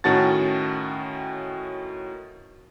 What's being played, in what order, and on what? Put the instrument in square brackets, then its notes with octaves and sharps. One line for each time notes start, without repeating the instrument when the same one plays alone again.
[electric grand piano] A2 D#3 C#4 F#4 A5 A6